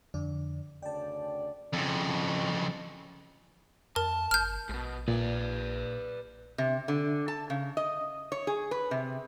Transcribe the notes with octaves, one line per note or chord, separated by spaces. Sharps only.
F2 D3 D5
D2 C#3 D5 G5 A5
F2 C#3
F2 A#4 A5
G1 F6 G6
A#1 G#2 B2
A#2 B4 D5
C3
D3
A5
C#3
D#5
C#5
G#4
B4
C3